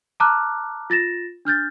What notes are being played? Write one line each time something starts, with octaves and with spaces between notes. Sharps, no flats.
A5 A#5 D6 F6 F#6
F4 A6 A#6 E7
D4 F6 G6 A6